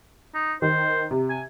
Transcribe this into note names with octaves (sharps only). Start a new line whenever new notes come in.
D#4
D#3 C5
C3
G#5